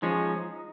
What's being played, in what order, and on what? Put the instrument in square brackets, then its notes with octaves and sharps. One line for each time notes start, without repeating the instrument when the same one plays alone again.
[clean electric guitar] F3 G#3 C#4 [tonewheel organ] D#4